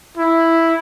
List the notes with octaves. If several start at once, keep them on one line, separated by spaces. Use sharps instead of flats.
E4